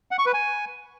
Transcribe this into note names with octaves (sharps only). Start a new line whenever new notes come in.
F#5
C#6
B4
G#5